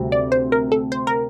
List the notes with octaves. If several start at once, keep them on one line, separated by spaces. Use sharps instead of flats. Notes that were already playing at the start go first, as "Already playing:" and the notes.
Already playing: D2 C3 G3 C4 F#4
D5
C5
A#4
A4
C5
A#4